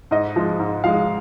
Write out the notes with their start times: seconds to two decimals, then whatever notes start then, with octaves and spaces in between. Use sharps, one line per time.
0.11 G#2 D#5
0.36 F3 G#3
0.59 G#2
0.84 F3 G#3 F5